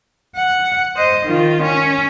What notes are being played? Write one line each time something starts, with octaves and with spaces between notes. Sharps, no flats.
F#5
C5 D#5
D#3 F4
C#4